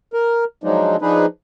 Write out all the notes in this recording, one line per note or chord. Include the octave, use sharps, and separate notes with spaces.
A#4
F3 F#3 G#3 D4 D#4
F3 D4 D#4 G#4 B4